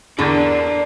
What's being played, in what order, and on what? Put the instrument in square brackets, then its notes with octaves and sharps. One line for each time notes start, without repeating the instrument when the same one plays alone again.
[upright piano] E2 C#6 A6 [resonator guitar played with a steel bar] D3 [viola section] D4 A#4 [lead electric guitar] D5 A#5